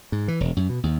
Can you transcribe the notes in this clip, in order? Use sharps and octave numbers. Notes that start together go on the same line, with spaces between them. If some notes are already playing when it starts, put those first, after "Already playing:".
G#2
E3
E1
F#2
B2
D#2